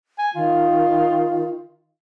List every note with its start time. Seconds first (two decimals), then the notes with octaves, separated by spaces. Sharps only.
0.19 G#5
0.35 D#3 F4